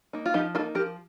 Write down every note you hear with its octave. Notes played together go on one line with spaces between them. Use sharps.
A#3 D#4
F4
F3 D#4 G4
A#3 D#4 F4 A4
F3 G4 A#4